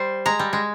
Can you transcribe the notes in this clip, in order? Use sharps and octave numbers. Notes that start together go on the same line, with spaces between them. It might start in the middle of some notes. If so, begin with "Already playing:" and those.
Already playing: G3 C5
G#3 A#5
G3
G#3